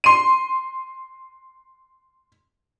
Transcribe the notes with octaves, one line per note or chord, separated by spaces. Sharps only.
C6 D#7